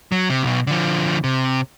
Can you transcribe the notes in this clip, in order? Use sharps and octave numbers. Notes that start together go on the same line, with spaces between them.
F#3
C3
B1 B2
D3 F3
C3